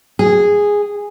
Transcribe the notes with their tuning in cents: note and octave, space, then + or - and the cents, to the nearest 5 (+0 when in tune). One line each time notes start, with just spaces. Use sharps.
G#4 -10